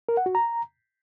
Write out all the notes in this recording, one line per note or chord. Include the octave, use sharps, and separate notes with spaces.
A#4
F#5
F#4
A#5